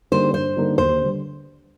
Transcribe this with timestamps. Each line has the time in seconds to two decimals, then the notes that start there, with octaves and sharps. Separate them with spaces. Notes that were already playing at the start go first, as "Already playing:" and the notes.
0.12 D3 G3 A#3 D#4 C5
0.33 G2 C5
0.57 D3 G3 A#3 D#4
0.78 D#2 C5
1.01 D3 G3